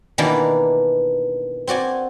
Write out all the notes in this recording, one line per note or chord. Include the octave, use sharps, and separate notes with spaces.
B2 D#3 E3 A#3 D4 A#4
C4 F#4 D5 G#5